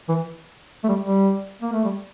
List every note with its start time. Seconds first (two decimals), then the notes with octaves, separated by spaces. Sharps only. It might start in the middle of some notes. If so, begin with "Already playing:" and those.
0.09 E3
0.84 A3
0.89 G3
1.04 G3
1.62 A#3
1.73 A3
1.84 G3